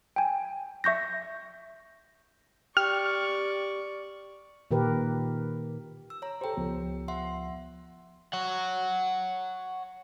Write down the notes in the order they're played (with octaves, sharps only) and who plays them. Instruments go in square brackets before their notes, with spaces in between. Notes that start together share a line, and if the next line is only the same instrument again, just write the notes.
[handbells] G5 G#5
E5 C#6 G6 A#6
[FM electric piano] G4 [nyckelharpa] D5 C#6 [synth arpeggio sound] F6
[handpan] A#2 D#3 G4 A#4 B4
[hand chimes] E6
C#5 A#5
[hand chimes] G4 G5 [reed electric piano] A4 C5
[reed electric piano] C#2 F3 B3
[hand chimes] E5 F#5 C6
[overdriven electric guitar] C#5 F#5